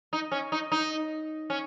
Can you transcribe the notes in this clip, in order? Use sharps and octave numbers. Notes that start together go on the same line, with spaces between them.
D#4
C#4
D#4
D#4
C#4